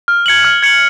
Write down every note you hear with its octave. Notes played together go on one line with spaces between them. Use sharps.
F6
G#6 C#7 F#7
F6
G#6 C#7 F#7